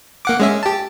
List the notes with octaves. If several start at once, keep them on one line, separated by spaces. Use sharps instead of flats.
A#3 F#5 D6
G#3 C#4 E5
G4 A5